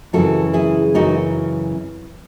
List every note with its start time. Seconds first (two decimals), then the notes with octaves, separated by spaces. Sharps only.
0.13 F#2 C#3 E3 F#4 A4
0.53 E4 G#4
0.94 F#2 C#3 E3 D#4 F#4